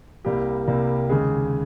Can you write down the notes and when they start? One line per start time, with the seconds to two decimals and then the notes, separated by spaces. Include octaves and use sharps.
0.25 C2 C3 G3 A#3 G4
0.67 C2 C3 G3 A#3
1.09 D#2 C#3 G#3 G#4